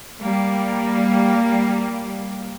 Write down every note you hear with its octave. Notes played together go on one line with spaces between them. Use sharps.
G3 A#3